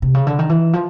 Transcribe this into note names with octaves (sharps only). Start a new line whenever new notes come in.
C3
C#3
D3
D#3
E3
F3